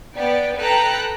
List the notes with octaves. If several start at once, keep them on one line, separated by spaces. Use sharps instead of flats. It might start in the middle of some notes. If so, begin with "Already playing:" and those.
B3 D5 G5
A4 B4 G5 A#5 F#6